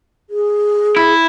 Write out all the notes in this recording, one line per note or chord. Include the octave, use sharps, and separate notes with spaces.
G#4
E4